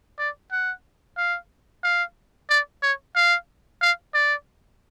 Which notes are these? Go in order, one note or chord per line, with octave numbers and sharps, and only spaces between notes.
D5
F#5
F5
F5
D5
C#5
F5
F5
D5